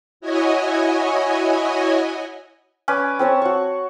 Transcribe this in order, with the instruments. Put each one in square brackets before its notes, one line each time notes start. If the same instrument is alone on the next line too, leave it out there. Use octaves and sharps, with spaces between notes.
[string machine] E4 F#4 C#5 D#5 G#5
[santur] C#4 B4 D5
C4 C5 C#5 A5
F#4 C#6